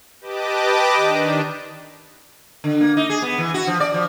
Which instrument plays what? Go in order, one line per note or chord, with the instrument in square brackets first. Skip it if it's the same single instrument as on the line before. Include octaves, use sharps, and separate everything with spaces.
[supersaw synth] G4 B4 D#5 A5 D6
D#3 D4
[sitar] D3
A#3
D#4
G#4
B3
E3
F#4
F3
D5
F3